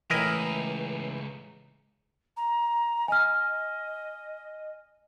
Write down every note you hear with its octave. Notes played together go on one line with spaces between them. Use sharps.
C#2 A2 E3 E4 A#4 D#5 A#5
A#5
D#5 G#5 F6